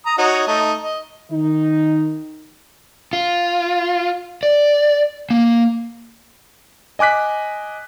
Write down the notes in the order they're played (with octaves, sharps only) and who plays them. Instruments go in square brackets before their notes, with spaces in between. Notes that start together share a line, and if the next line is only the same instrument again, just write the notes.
[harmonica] A#5 D#6
D#4 F#4 C#5
A3 D#4
D#5
[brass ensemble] D#3 D#4
[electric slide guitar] F4
D5
A#3
[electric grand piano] D#5 G#5 D6 F#6 B6